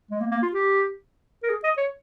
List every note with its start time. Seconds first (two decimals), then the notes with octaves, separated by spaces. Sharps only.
0.11 G#3
0.20 A#3
0.31 A#3
0.42 F4
0.53 G4
1.43 A#4
1.50 G#4
1.64 D#5
1.77 C#5